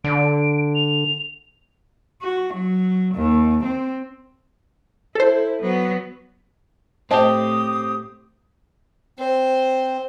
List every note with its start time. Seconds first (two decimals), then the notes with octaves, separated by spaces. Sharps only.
0.04 D3 D7
0.75 F7
2.22 F#4
2.54 F#3
3.15 D#2
3.64 C4
5.15 E4 A4 C5
5.61 F#3 B3
7.11 A2 C4 G4 C5 D#5 A5 D#6
9.19 C4 C5